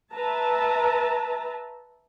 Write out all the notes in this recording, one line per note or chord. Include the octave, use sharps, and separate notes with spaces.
B4 E5 A5 A#5